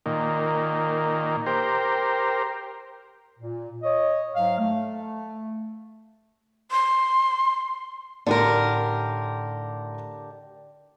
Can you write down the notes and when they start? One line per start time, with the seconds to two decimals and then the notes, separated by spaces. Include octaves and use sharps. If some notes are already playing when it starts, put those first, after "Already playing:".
0.06 A#2 D#3
1.46 G4 A#4 C5
3.40 A#2
3.83 C#5 D#5
4.35 G#2 F#3 F5
4.59 A3
6.71 C6
8.26 A2 D3 D#4 G4 A#4 C6